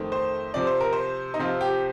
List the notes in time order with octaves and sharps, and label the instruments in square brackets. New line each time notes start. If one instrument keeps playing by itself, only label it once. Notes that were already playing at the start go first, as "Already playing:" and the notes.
Already playing: [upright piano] F2 D#3 A3 C4
C5
C3 F3 C4 D5
C5
A#4
C5
D#4
C3 F3 C4 F4
G4